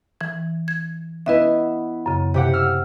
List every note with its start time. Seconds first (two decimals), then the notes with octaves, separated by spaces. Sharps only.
0.21 E3 G#6
0.68 G#6
1.26 B3 E4 B4 D#5 E5
2.06 F#2 C#3
2.34 C3 G4 F#5
2.54 E6 F6